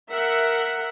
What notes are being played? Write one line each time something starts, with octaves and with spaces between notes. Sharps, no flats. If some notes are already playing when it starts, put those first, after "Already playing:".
A#4 E5 F#5